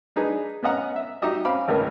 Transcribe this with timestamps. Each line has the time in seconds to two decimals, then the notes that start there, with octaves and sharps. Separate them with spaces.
0.16 D4 D#4 G#4 B4
0.63 B3 C#4 D#5 F#5 A#5
0.96 E5
1.22 D#4 F#4 G4 D#5 E5
1.45 C4 C#4 F5 B5 D6
1.68 G#1 C#2 A3 A#4 B4